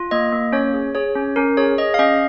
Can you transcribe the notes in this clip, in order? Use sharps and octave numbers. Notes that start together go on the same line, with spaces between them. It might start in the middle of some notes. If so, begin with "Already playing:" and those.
Already playing: F4
A#3 D#5
A#3
C#4 C#5
G#4
G#4 C#5
C#4
C#4 A#4
G#4 C#5
G#4 D#5
F5
C#4 D#5